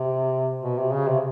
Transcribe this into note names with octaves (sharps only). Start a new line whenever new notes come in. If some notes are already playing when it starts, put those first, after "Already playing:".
Already playing: C3
B2
C3
C#3
C3